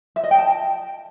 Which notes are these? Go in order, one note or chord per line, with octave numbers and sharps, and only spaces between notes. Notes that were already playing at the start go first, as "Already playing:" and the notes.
E5
D#5
G5
A5